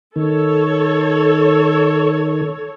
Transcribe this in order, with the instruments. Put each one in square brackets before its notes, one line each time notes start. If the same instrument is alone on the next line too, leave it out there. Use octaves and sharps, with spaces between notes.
[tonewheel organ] D#3 [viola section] A4 C#5